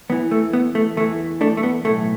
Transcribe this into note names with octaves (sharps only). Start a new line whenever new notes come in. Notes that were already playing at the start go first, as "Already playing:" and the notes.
E2 E3 B3
A3
B3
A3
E2 E3 A3
A3 D4
A3
B3
B1 A2 E3 A3